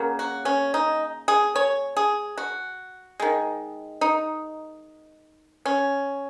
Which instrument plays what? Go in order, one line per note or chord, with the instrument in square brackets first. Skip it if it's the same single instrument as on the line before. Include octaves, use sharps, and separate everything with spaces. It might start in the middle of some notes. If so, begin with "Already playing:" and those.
Already playing: [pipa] C#3 F#3 A#3
F#4
C#4
D#4
G#4
C#5
G#4
F#4
D#3 G#3
D#4
C#4